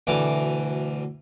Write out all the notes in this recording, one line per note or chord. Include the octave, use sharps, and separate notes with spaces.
D2 B2 E3 D6